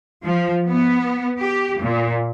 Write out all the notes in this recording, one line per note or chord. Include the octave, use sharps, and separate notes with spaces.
F3
B3
G4
A#2